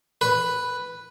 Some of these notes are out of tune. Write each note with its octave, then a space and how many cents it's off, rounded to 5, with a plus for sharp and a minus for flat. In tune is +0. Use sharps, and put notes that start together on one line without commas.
B4 +0